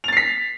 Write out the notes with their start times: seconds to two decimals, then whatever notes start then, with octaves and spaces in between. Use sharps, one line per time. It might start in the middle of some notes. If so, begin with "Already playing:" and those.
0.04 F7
0.08 A6
0.12 C7
0.17 B6